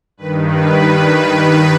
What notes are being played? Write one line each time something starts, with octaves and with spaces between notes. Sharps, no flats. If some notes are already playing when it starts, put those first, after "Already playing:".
G2 D#3 B4
B4